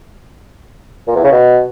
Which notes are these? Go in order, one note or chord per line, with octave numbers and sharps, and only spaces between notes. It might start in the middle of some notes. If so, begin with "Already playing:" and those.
A#2
E2
C#3
B2